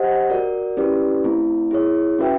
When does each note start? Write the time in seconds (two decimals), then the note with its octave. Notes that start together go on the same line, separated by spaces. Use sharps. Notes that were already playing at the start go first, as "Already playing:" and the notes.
Already playing: G4 C5 D#5 F#5
0.30 F#4 A#4 D5
0.77 C#4 E4 G4 B4 D5
1.24 A3 C4 E4
1.71 E4 G#4 C#5
2.19 C#4 F#4 B4 E5 G5